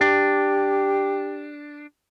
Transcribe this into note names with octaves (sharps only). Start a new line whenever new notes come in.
D4 G4